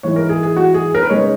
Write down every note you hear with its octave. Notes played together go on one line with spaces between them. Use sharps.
G#2 E3 G#3 C#5
A#4
G#4
G#4
F#4
G#4
A#4
B4
C#3 G#3 D#4 C#5